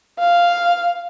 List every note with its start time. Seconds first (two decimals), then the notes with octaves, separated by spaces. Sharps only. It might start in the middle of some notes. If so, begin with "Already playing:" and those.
0.19 F5